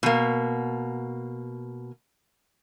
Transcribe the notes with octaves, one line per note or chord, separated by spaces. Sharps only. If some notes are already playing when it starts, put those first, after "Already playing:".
B2 A#3